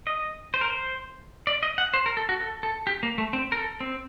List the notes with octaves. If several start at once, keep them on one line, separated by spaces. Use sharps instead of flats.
D#5
C5
A#4
C5
D5
D#5
F#5
C5
A#4
A4
F#4
A4
A4
G4
A#3
A3
C4
A#4
A4
C4